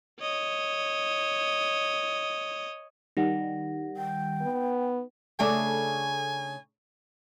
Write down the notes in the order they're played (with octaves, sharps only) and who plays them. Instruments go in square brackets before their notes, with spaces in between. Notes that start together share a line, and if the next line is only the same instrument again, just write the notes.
[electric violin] C#5 D#5
[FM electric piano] D#3 G3 [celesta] D#4 F#5 A#6
[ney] G5
[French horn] B3
[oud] C#3 A3 D4 [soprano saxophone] G#5